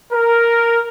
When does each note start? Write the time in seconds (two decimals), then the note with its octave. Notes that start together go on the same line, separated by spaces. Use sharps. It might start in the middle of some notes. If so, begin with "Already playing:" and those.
0.12 A#4